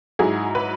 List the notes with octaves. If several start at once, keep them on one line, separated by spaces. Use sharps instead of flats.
G#2 F#3 E4 G#4
B4